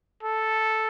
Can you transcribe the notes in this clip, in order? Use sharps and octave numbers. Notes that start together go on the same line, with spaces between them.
A4